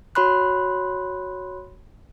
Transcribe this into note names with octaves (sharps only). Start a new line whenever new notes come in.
F#4 C#5 B5 C6 F#6